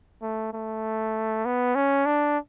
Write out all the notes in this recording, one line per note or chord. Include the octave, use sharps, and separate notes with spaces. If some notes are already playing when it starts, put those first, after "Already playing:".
A3
A3
B3
C#4
D4